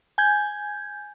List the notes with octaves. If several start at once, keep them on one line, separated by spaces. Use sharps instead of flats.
G#5 G6 G#6